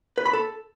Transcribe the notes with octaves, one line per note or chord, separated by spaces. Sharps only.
B4
B5
A4